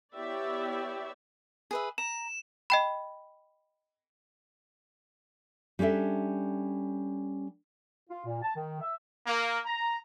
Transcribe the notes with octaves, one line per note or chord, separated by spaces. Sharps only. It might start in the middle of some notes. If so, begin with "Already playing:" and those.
B3 E4 G4 C#5 D5 E5
G#4 B4 E5
A#5 E7
D#5 G5 B5
G3 C#4 D4 A4 E5
F4
A#2
A5
D#3
E5
A#3
A#5